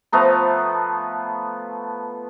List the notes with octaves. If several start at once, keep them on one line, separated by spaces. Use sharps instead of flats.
F3 A3 B3 A#5